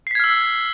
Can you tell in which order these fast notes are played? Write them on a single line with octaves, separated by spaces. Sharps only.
C7 B6 G#6 F6 E6